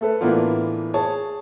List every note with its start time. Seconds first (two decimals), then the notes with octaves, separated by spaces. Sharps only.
0.01 A3 A4 B4
0.21 A2 E3 A#3 B3 D4 F4
0.94 G#4 C#5 A5